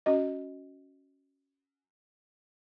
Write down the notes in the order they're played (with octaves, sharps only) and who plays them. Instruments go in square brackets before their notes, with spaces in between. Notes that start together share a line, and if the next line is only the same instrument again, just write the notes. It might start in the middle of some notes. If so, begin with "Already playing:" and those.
[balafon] C#4 F#4 D#5